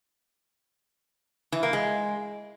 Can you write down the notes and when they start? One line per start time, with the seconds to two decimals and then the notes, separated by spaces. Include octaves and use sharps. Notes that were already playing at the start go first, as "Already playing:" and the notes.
1.52 E3
1.63 A#3
1.73 G#3